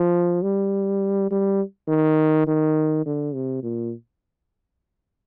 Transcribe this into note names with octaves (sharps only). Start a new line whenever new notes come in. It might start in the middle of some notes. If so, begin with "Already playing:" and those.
Already playing: F3
G3
G3
D#3
D#3
D3
C3
A#2